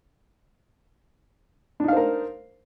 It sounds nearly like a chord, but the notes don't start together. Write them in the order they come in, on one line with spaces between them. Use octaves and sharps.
D4 D#4 F5 C5 A#4